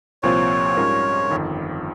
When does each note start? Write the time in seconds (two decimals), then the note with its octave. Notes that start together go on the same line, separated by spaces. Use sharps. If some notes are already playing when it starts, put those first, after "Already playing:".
0.23 C2 A#2 F3 C4 F4 C#5
0.77 G#2 G3 C#4 F4 A#4
1.31 G1 F2 D#3